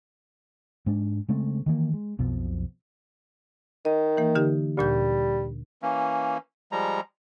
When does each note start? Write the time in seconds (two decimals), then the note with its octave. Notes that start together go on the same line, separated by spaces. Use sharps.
0.86 G#2 G#3 D4
1.29 C#3 G#3 A3 C4
1.66 D#3 E3 A#3
1.93 G#3
2.19 B1 F2 B2 F3
3.85 D#3 D#5
4.17 E3 A#3
4.35 D3 D#4 G4
4.77 D2 A#2 G3 G6
5.82 E3 A#3 C#4
6.72 F3 G3 G#3 A#5